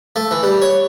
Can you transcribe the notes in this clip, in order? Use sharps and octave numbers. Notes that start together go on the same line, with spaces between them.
A3
E3
G3
C#5